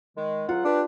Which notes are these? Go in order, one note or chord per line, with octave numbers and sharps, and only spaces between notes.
D#3 G#3
C#2 F#3 F4 F#5
D4 G4 B4